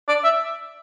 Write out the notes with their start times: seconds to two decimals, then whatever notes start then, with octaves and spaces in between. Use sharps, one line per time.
0.08 D5
0.24 E5